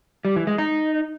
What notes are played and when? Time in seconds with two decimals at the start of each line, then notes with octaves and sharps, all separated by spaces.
0.25 G3
0.36 E3
0.47 G#3
0.58 D#4